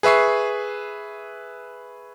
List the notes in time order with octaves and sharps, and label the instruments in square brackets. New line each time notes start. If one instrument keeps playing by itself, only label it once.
[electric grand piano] G#4 B4 E5 C#6 C7